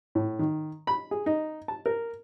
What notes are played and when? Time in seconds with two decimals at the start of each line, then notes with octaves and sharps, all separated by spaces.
0.15 A2
0.39 D#3
0.87 B5
1.11 G#4
1.26 D#4
1.68 A5
1.86 A#4